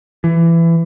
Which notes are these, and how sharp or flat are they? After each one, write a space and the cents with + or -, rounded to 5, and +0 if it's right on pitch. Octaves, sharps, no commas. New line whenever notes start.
E3 +20